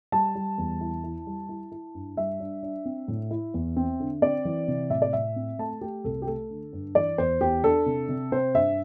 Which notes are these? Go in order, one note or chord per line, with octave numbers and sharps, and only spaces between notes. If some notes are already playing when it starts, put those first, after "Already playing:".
G3 A5
G3
E2
E4
E4
G3
E4
E4
G2
G3 E5
D4
D4
C4
A2
E4
E2
C4
D3
C4 D5
E3
C3
A2 E5
D5
A2 E5
C4
A3 A5
A3 G4
C2 A4
G4
A3 A4
D3
G2
E3 D5
E2 C5
E2 G4
D4 A4
C3
C3
C4 C5
G2 E5